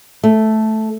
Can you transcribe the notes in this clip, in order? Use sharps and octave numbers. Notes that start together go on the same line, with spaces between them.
A3